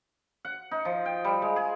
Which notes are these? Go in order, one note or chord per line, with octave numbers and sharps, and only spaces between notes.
F#5
D#4
F3
G5
G3
G#3
G#4